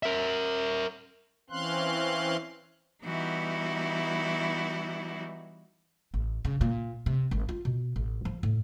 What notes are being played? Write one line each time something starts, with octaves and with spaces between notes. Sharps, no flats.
A#4 E5
E3 C4 C#4 F5 C6 F#6
E3 G3 B3 D#4 E4 F#4
A1
C#3
A#2
C3
G#1
F4
B2
A1
F3
A2